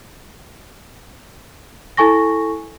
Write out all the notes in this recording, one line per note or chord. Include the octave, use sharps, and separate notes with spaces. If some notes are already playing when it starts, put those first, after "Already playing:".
E4 A4 G#5 C#6 A#6